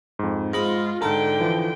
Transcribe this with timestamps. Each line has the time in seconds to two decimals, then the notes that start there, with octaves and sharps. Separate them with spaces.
0.19 F2 G#2
0.53 G#2 F4 B5 A#6
1.02 G#2 D3 A4 G5 A#5
1.40 E3 F3